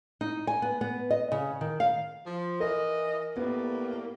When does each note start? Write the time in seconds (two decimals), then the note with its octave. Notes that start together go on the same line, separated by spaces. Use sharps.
0.21 D#4
0.47 G#5
0.62 B3
0.81 B3
1.11 D#5
1.32 C#3
1.61 D#3
1.80 F5
2.27 F3
2.60 E3 A#4 D#5
3.36 A2 G3 A#3 B3